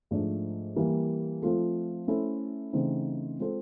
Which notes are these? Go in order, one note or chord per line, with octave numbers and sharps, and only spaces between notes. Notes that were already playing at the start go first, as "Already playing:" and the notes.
G#2 F3 A3 D4
E3 G3 A#3
F3 A3 C4 F4 A4
A3 C#4 E4 A4 C5
C#3 E3 A3 C4 D#4
G#3 C4 F4 A4 C5